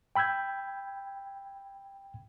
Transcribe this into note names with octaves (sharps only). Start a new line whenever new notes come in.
G5 B5 E6 G6 G#6